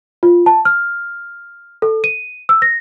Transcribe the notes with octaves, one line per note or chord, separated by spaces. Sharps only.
F4
A5
F6
A4
D#7
E6
A#6